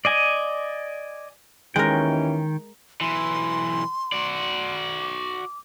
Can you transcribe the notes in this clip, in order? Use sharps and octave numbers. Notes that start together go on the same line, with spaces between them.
D5 D#5 G#5
D#2 D#3 E3 G#3 C#4 A#4 G5
B1 E3 C6
F#4 D5
D6